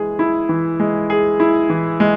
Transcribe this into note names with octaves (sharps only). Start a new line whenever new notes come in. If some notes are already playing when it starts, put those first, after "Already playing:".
Already playing: E3 G#3 G#4
E4
E3
G#3
G#4
E4
E3
G#3